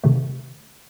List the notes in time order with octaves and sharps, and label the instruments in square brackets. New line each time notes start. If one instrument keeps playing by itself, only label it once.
[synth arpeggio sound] C3 D#3 A3